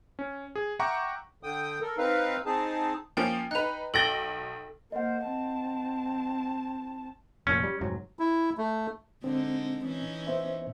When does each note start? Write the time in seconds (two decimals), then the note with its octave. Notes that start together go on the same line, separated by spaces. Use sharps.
0.19 C#4
0.55 G#4
0.79 E5 F#5 G5 A#5 C#6 D6
1.43 D3 G5 D#6
1.81 A4 A#4
1.98 C4 D#4 B4 F5
2.46 C4 D#4 G#4 A5
3.17 F3 A#3 C#4 G5
3.51 D#4 B4 F#6 F7
3.94 B1 A4 G5 A#6 G7
4.92 A#3 C5 D#5 F#5
5.27 C4 A5
7.47 F1 A#2 C#4
7.64 G3
7.81 F1 G#2 F#3
8.19 E4
8.58 A3
9.24 D3 G#3 C4 D#4
9.84 E3 C#4 D#4
10.27 B3 C5 E5